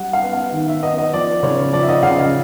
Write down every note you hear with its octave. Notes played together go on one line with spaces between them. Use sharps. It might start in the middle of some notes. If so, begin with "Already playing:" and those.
Already playing: G3 F#5
F5
B3
F5
D#3
E5
B3 D#5
D#5
F3 D5
C#3 C#5
F3 D5
E5
D#5
C#3 F5
D#5